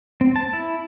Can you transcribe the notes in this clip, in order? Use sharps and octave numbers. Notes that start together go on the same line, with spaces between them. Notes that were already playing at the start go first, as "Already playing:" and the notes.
C4
A5
E4